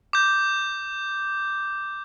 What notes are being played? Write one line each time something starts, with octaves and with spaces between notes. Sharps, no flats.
D6 G6